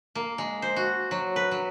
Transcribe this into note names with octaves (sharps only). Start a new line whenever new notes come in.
A#3
G#3
C5
F#4
F#3
B4
F#3